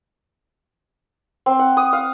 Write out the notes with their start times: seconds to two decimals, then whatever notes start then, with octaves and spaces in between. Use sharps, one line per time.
1.46 C4
1.59 F#5
1.77 D#6
1.93 F5